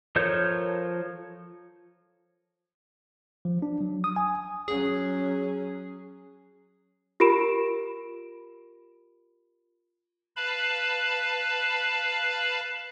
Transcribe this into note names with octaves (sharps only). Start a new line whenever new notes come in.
F3 A4 A#4 C#5 G6
F3
D4
F#3
D#6
G#5
F#3 C#4 G#4
F4 G4 A#4 B5 D7 E7
B4 F5 A5 B5